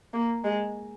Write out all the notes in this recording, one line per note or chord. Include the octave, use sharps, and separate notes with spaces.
A#3
G#3